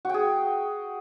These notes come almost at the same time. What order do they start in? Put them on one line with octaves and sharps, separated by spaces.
F#4 G5 G#4